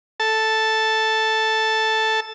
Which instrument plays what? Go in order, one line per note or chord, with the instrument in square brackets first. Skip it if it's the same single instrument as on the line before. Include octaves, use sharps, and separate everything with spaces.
[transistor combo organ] A4 A5